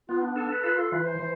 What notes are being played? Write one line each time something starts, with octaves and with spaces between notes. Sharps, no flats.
B3 F4
D4
D4 A4
B4
F4 B4
A4
E3 B4
C5
E3 C5